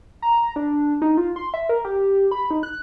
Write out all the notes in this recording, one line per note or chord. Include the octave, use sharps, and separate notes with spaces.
A#5
D4
D#4
F4
C6
E5
A#4
G4
B5
D#4
F#6